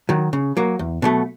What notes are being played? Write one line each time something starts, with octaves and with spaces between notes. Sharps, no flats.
D#3 F#3
C#3
F#3 A#3
E2
B2 F#3 A3